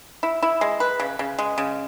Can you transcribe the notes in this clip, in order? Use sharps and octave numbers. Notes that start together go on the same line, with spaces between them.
E4
E4
G#3
B4
C#3
C#3
G#3
C#3